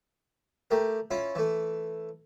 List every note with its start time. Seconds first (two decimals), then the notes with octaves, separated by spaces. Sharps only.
0.71 A3 G4 A#4
1.11 C#4 E4 F4
1.35 E3 A3